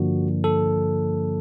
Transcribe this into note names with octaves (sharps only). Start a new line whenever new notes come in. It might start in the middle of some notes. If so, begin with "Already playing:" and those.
Already playing: G2 D3 F3 A#3 D4 F#4
A4